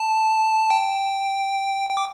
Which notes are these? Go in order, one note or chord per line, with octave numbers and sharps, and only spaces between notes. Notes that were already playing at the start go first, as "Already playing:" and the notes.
Already playing: A5
G5
G5
D6